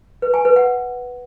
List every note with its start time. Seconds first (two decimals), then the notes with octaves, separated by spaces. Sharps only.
0.22 B4
0.34 G#5
0.45 B4
0.56 F#5